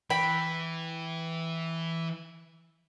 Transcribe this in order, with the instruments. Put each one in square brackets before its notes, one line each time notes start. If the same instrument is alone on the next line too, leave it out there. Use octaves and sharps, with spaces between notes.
[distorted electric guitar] E3 [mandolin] G5 B5